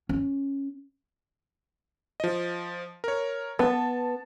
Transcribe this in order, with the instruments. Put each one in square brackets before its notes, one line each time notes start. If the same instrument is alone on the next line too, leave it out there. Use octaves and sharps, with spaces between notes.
[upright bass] C#4
[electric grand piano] F3 D#5
A#4 C#5
[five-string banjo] B3 [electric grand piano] A5